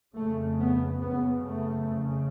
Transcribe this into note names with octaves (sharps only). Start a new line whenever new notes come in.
F2 C#3 A3
B3
F#2 C#3 B3
A3
F2 C#3